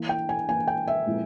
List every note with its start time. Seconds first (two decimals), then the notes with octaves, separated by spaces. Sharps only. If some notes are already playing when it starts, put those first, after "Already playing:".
Already playing: E3 A#3 E4
0.09 G5
0.29 G#5
0.48 E3 A#3 E4 G#5
0.68 G5
0.87 E5
1.06 A#2 F3 G#3 C4 E4